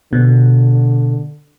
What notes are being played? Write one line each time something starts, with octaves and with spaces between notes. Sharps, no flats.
B2 D3